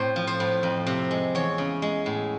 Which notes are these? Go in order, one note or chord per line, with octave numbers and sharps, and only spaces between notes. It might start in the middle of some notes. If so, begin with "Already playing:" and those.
Already playing: A2 C4 C5
F3
C5
A2
F2
C3
G#3
E2 C#5
C#3
G#3
A2